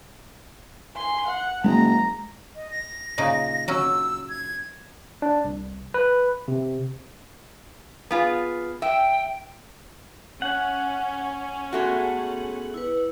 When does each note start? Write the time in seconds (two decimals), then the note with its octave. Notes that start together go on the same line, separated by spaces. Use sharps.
0.95 G#5 C6
1.27 F#5
1.64 F#1 G#3 A#5
2.56 D#5
2.71 A#6
3.18 A#2 C#3 D#4
3.68 F#3 C#4 E6
4.29 G#6
5.22 D4
5.45 C2
5.94 B4
6.48 C3
8.11 B3 F4 G#4
8.82 E5 G5
10.42 C#4 F#5
11.73 G#3 A3 B3 F#4 G#4
12.74 E4 B4